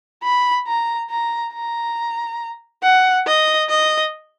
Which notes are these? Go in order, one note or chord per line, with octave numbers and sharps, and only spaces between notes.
B5
A#5
A#5
A#5
F#5
D#5
D#5